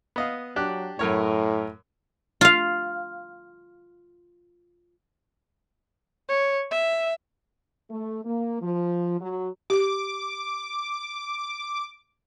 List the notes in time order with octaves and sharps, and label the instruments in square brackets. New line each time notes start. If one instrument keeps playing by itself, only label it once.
[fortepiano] B3 D#5 F5
[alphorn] F#3 [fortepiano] D4 G4 F#6
[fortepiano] F#2 A#4 C#5 [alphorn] A2
[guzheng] F4 F5
[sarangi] C#5
E5
[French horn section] A3
A#3
F3
F#3
[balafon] G4 [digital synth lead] D6